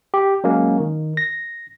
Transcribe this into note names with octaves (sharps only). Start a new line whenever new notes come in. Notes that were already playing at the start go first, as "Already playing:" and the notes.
G4
F#3 G#3 A#3 C#4
D#3
A#6